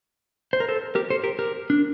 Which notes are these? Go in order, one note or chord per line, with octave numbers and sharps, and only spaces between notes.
C5
A#4
A4 C5
G4 A#4
A4 C5
G4 A#4
G4 A#4
D4